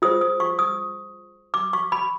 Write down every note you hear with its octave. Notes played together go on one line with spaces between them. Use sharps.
F4 G#4 C5 D#6
D#6
C#6
D#6
D6
C#6
B5